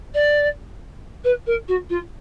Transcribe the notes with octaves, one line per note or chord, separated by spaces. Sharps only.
D5
B4
A#4
F#4
F4